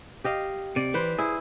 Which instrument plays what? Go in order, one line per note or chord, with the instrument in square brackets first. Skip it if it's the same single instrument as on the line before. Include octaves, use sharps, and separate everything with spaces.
[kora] G4 D#5 F5
[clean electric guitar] C3 [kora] D5
[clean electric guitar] E3 [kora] B4 C5
[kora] E4 [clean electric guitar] G#4